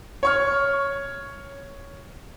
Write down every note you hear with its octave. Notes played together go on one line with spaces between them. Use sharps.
C#5 C#6 F6